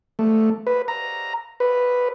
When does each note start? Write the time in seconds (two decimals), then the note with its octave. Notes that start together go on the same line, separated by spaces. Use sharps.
0.19 A3
0.67 B4
0.88 A#5
1.60 B4